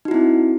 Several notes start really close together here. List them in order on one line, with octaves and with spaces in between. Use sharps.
D#4 F#4 E4 C4